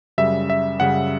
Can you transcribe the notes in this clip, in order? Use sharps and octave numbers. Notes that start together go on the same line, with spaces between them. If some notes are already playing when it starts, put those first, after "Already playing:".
F#2 C#3 G3 E5
E5
F#2 C#3 G3 F#5